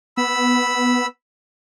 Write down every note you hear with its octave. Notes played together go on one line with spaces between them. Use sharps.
B3 B5 E6